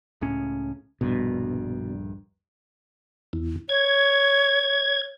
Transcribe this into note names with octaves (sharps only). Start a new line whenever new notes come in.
C#2 A2 C#4
D#1 A#1 G2 B2
E2
C#5 G#6